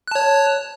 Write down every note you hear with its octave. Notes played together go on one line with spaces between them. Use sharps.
C#5 A5 F#6